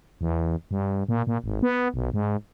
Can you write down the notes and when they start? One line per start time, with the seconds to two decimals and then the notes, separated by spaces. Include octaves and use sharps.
0.21 E2
0.71 G2
1.09 A#2
1.27 A#2
1.44 G#1
1.62 B3
1.94 B1
2.14 G#2